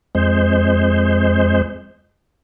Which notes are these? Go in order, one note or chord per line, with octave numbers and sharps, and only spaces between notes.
F2 G#3 C5